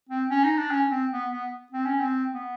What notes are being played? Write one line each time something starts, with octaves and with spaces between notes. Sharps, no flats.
C4
C#4
D#4
D4
C#4
C4
B3
B3
C4
C#4
C4
B3